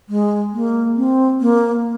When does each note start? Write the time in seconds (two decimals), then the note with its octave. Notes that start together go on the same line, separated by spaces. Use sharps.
0.09 G#3
0.53 A#3
0.97 C4
1.41 A#3